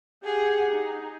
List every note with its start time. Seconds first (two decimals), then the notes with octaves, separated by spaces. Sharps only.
0.22 G4 G#4 F#5
0.70 D#4